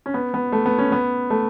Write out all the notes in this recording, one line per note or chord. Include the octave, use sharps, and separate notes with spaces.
C#4
B3
B3
A3
B3
C#4
B3
A3